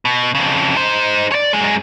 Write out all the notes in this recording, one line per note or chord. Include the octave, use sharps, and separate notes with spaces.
B2
F2 C#3
D#4 C5
C#5 D5
F#2 G#3